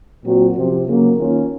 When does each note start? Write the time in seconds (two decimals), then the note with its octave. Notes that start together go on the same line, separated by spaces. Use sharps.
0.24 A#2 F#3 C4 F#4
0.55 C3 F3 C4
0.86 C#3 F#3 A#3
1.17 D#3 A#3 C#4 F4